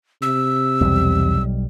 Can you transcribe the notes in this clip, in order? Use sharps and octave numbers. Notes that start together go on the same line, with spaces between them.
C3 E6
B1 E2 G3